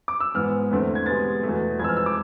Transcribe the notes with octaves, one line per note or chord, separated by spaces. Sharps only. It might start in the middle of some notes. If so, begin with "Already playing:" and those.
D6
E6
G#2 E3 B3 F6
E2 D3 A3 C4
G#6
C3 G#3 B3 A6
E2 B2 A3
F2 E3 G#3 C4 E6 G#6
F6
E6
D6